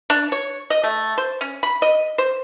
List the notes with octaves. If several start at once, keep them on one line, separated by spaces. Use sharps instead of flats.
D4
C#5
D#5
A3
C5
C#4
B5
D#5
C5